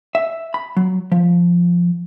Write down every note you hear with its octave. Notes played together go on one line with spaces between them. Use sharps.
E5
B5
F#3
F3